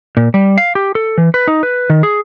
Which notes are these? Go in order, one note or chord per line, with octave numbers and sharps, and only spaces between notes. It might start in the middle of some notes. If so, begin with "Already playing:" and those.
A#2
G3
F5
G4
A4
E3
B4
D#4
B4
D#3
G#4